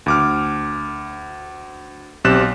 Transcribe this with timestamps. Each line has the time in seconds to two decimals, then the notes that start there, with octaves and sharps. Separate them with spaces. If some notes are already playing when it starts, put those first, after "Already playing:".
0.06 D2 D6 F6
2.24 B1 C4 G4 F#6 A6 E7